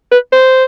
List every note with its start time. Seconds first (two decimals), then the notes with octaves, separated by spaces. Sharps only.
0.11 B4
0.32 C5